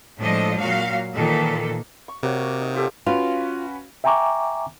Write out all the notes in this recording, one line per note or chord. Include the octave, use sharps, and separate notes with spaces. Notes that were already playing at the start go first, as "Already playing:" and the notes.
A2 F3 G#3 D4 A4 D#5
A#2 F#3 F#4 F5
A#2 D#3 E3 A4
C#6
C3 A#3 F#4 C#5
D#4
F4 G4 A4
C#4 F4 F#4 B4 F5
E5 G5 G#5 A#5 C#6 D6